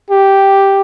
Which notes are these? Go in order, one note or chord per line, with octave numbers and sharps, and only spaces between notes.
G4